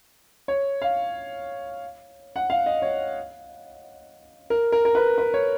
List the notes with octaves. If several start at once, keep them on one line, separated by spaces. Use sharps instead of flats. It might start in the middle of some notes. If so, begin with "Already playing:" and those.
C#5
F5
F#5
F5
D#5
C#5
A#4
A#4
A#4
B4
B4
C#5